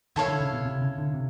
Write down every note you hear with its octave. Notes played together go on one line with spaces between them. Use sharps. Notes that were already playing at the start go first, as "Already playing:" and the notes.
D#3 E4 A4 C#5 F5
D3
C#3
B2
C3
C#3
D3
C3